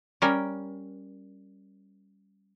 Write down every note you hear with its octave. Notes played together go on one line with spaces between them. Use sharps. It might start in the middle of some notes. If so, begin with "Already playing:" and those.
G3 C#4 A#4